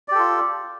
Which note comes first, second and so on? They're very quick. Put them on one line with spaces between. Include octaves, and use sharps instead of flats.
D5 G4 A4 F4